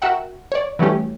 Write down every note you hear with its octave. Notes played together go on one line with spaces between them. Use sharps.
F#4 A#4 E5 F#5 G5
C#5 D5
E3 F#3 G3 A3 C#4 G4